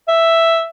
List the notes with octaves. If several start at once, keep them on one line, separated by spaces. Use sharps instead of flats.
E5